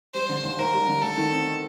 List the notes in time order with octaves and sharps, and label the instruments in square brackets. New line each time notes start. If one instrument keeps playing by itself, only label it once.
[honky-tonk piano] G3 [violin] C5
[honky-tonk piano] D3
D#2
[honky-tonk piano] D#2 [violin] A#4
[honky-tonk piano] G3
D3
[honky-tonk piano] A3 [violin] A4
[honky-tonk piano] D#3
C4